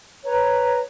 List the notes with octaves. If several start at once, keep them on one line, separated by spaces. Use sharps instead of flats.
B4 C#5 A#5